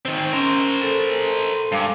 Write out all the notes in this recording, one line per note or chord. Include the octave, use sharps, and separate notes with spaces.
D#3 C4
C#4 A#4 C5
A4
G2 G#3 F5 D6